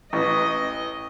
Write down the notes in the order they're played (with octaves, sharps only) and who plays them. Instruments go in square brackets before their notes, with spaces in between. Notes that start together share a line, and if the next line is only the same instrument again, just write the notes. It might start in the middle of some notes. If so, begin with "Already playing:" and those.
[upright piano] A1 [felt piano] B4 C#6 [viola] D#5